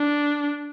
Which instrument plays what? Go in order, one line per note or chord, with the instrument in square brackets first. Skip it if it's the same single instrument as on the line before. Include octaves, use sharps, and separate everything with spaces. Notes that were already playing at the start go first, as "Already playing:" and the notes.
Already playing: [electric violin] D4